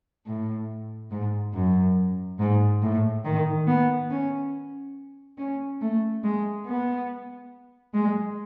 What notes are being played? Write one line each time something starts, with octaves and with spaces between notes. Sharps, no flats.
A2
G#2
F#2
G#2
A2
D#3
B3
C#4
C#4
A3
G#3
B3
G#3